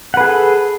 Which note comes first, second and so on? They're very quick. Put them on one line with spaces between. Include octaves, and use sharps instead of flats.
F#5 B4 G#4 A4